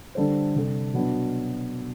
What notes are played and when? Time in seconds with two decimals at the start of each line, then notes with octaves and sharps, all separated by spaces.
0.15 D3 G3 D4 A4 C5
0.56 C3 G3 D4 A4
0.94 B2 F#3 B3 D4 F#4